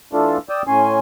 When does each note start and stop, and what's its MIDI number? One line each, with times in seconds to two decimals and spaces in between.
0.13 0.38 52
0.13 0.38 57
0.13 0.38 62
0.13 0.38 65
0.13 0.38 69
0.49 0.62 74
0.49 0.62 79
0.49 0.62 87
0.49 0.62 88
0.67 0.99 45
0.67 0.99 61
0.67 0.99 80
0.67 0.99 84